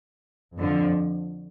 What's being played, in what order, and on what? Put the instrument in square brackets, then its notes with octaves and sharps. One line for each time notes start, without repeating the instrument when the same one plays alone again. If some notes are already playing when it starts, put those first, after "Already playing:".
[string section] F2 D3 F3